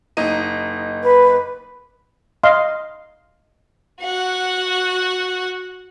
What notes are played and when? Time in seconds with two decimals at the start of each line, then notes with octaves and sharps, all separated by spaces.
0.17 F#1 D#4 D#7
1.03 B4
2.43 D#5 F5 C6
4.03 F#4 F#5